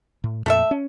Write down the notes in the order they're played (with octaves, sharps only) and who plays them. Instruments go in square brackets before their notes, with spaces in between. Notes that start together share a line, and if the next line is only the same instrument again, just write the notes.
[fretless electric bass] A2
[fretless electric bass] F2 A#2 [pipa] A3 A4 E5
[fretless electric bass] C#4